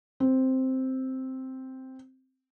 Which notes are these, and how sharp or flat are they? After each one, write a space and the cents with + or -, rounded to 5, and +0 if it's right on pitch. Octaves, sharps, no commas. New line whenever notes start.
C4 +0